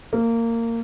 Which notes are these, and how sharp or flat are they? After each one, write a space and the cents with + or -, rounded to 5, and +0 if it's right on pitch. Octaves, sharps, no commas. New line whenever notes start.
A#3 -20